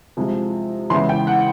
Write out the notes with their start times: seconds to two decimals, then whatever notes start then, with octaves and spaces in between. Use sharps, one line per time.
0.17 C3 F3 G#3
0.90 C#3 E3 G#3 B3 E4 C6
1.09 G5
1.27 F#5